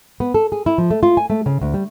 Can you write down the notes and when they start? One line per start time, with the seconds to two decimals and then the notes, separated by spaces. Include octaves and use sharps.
0.20 B3
0.34 A4
0.52 G#4
0.66 E4
0.78 F3
0.91 A3
1.03 F4
1.17 G#5
1.30 A3
1.46 C#3
1.61 D2
1.74 G3